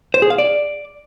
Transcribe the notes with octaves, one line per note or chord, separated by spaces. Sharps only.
C5
G#4
F5
D5